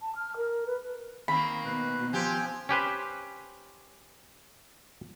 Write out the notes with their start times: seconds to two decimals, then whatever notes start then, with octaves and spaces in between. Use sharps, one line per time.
0.01 A5
0.15 F6
0.36 A#4
0.66 B4
1.28 D#3 A#3 C4 B5
1.65 B2 B4
2.13 F3 C4 G4 G5 G#5
2.69 C#4 G4 B4 C5